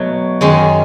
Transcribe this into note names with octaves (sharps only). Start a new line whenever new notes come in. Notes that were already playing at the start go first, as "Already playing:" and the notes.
Already playing: B2 F#3 A3
F#2 D#3 G#3 C#4